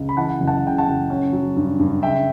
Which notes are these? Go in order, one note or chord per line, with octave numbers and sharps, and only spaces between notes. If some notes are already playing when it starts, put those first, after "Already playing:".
Already playing: C#2
B5
E3 F#5 A5
F#1
F#5 A5
C#3 G5
F#5 A5
F#1
C#4
F#3
G2
G2
C#3 E5 G5